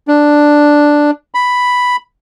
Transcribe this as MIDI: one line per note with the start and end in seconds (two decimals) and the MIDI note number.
0.08 1.11 62
1.34 1.96 83